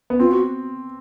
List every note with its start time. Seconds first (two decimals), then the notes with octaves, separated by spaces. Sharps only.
0.10 B3
0.20 C4 F4
0.31 F#4